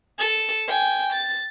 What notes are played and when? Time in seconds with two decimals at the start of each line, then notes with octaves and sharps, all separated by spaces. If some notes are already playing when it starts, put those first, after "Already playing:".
0.19 A4
0.68 G5 G#5
1.13 A6